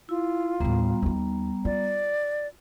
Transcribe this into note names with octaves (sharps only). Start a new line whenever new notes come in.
E4 F4
D#2 A2 G3 B3 A#5
D#2 D#4
F4 D5